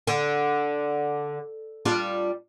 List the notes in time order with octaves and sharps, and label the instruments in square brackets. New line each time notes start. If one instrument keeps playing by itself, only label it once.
[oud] D3
G3 D4 F4